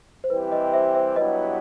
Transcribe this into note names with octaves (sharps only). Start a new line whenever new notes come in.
C5
E3 G3 C4 E4 G4 B4
B4 D#5
C5 E5
C5 E5
G2 F#3 B3 E4 G4 B4 D#5